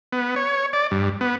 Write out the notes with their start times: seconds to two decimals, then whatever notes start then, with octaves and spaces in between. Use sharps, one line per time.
0.12 B3
0.36 C#5
0.73 D5
0.91 G2
1.21 B3